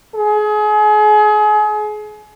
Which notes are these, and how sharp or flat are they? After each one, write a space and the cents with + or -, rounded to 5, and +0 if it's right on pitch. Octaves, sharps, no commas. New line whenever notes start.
G#4 +30